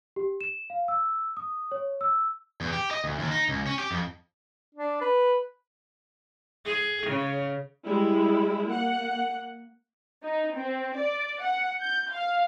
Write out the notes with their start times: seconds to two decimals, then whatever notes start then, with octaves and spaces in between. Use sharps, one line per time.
0.16 G4
0.41 E7
0.70 F5
0.88 E6
1.37 D#6
1.72 C#5
2.01 E6
2.61 E2
2.73 G4
2.91 D#5
3.04 D2
3.19 D#2
3.31 D#4
3.49 C#2
3.66 C#4
3.79 G4
3.91 F2
4.75 D4
5.01 B4
6.66 G#4
7.06 C#3
7.84 G3 G#3 E4
8.67 A#3 F#5
10.23 D#4
10.55 C4
10.97 D5
11.42 F#5
11.80 G6
12.11 F5